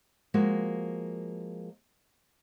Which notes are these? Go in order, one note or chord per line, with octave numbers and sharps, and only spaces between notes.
F3 G#3 A#3 F#4